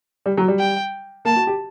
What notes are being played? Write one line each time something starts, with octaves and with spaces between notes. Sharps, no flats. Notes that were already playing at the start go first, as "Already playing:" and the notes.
G3
F#3
G3
G5
A#3 A5
F#4
G4